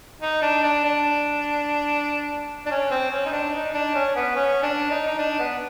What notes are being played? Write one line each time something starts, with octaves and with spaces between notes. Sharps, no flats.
D#4
D4
D4
D4
D4
C#4
C4
C#4
D#4
D4
D#4
D4
C#4
B3
C#4
D4
D#4
D#4
D4
B3